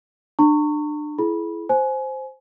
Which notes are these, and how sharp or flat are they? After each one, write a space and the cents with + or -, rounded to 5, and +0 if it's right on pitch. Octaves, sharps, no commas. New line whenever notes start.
D4 +30 A#5 -40 C#6 +0
E4 +20 G#4 +35 B5 -15
C5 +0 G#5 +25